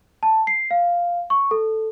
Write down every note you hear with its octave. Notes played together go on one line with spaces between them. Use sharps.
A5
C7
F5
C#6
A4